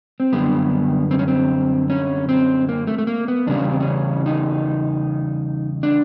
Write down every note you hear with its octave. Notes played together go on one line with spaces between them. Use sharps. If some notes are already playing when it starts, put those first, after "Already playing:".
C4
F#2 D3 G3 B3
C4
C#4
C4
C#4
C4
A#3
A3
A3
A#3
B3
E2 C#3 G3 D4
C#4
C4
C#4
D#4
D4